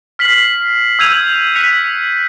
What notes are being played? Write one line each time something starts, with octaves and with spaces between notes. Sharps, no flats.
F6 B6 C7 F#7
E6 G6 G#6 D#7 F7
F#6 B6 C#7 D#7 F7